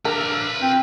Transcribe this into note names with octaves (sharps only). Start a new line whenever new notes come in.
D4 A#4 B4 E5 F5 A#5
C4 F4 G5